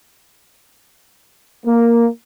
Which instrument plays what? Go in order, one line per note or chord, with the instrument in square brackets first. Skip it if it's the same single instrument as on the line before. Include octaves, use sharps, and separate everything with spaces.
[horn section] A#3